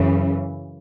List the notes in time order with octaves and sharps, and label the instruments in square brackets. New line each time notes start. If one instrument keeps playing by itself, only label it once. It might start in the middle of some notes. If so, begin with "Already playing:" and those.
Already playing: [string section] F#2 C#3 E3